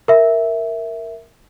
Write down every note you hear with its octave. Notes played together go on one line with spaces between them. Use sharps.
A#4 E5